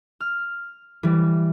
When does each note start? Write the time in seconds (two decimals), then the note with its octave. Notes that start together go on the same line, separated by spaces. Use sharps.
0.20 F6
1.03 E3 G3